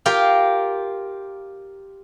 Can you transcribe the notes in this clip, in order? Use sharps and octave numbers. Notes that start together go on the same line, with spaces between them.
F4 G4 A#4